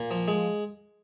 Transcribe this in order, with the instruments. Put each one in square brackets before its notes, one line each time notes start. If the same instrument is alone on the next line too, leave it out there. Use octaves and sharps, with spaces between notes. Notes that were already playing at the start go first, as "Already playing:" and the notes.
Already playing: [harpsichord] A#2
F3
G#3